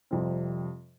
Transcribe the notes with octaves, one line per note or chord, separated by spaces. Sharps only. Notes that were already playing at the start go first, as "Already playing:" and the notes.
F2 C3 G3 C4